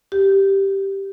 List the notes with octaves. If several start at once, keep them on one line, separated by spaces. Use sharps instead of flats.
G4